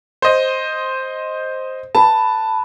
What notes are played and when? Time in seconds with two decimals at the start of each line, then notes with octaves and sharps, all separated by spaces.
0.22 C5 D#5
1.95 B4 A5